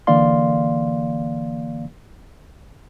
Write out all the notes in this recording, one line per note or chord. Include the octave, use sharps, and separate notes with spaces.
D3 E3 A#3 D5 F5 C6